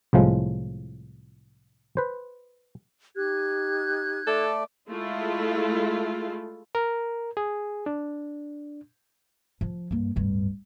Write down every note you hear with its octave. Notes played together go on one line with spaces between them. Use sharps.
C2 A2 F3 G#3
B4 C5
D#4 G4 F#6 G#6
A3 A4 D5
G#3 A3 E4 F4
A#4
G#4
D4
F3
G2 A#3
D1 G2